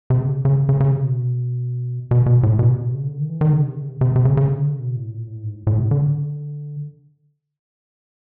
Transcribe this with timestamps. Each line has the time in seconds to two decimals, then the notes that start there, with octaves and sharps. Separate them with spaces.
0.10 C3
0.22 C#3
0.45 C#3
0.69 C#3
0.80 C#3
0.92 C3
1.04 B2
2.11 B2
2.26 B2
2.43 A2
2.59 B2
2.70 C3
2.83 B2
2.94 C#3
3.06 D3
3.18 D#3
3.30 E3
3.41 D#3
3.53 C#3
3.65 C3
3.78 C#3
3.89 C3
4.01 C3
4.16 C3
4.25 C#3
4.37 C#3
4.48 D3
4.65 C#3
4.79 B2
4.96 A2
5.11 A#2
5.27 A2
5.43 G#2
5.55 A2
5.67 A2
5.79 C3
5.91 D3